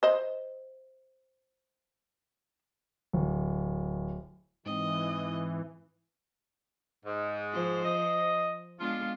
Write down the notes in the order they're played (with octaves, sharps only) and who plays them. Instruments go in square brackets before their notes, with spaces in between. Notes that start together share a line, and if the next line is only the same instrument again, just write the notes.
[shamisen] C5 D#5
[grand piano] D1
[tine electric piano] G#2 C4 [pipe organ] E3 [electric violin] D#5
[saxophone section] G#2
[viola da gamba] F3 C5
[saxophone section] D#5
[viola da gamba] G#3 B3 D4 [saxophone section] F4